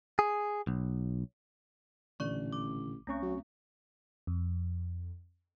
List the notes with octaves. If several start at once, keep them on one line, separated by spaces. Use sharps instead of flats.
G#4
B1
A1 A#2 D3 E3 D5 C#6
D6
C2 A3 C4 C#4 C#6
F#3
F2